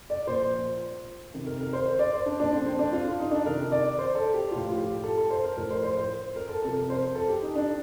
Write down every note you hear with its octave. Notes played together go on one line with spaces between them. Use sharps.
D5
A#2 F3 C5
C3 D#3
A#4
A#4
C5
C5
D5
C5
D4
A#2 F3 D4
C4
C4
D4
F4
F4
D#4
D4
C3 D#3 A#4
D5
C5
A4
G4
A2 F3 F4
F4
G4
A4
A4
C5
A#4
A2 F3 A#4
C5
C5
C5
A#4
A4
C3 F3 A4
A#4
C5
A4
G4
D#4
D4